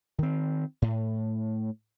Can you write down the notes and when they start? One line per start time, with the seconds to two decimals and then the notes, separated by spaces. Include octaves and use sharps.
0.18 D#3 C4
0.82 A2